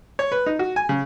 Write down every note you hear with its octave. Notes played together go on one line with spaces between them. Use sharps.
C#5
B4
D#4
F#4
G#5
C#3